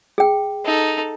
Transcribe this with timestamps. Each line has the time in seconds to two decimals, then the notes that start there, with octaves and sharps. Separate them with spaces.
0.18 G#4 G5
0.65 D#4 A4